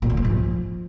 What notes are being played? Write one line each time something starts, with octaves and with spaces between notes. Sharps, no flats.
A#2
D3
G#2
F3